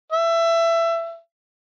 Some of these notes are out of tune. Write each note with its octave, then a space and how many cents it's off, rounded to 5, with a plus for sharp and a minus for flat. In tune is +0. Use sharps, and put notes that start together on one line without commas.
E5 +20